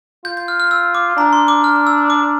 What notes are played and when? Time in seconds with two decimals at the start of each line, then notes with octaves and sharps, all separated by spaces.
0.25 F4 G6
0.37 G6
0.48 F6
0.60 F6
0.71 E6
0.95 D6
1.17 D4 A#5
1.33 C6
1.48 D6
1.64 F6
1.87 E6
2.10 D6